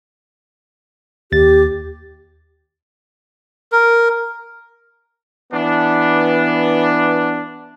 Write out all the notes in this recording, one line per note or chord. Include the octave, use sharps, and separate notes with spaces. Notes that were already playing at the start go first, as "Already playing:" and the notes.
D#2 G4 A6
A#4
E3 B3 D4